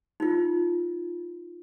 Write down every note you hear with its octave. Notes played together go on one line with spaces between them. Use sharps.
D#4 F4